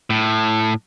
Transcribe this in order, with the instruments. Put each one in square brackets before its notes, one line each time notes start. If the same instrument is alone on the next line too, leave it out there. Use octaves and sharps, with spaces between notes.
[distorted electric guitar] A2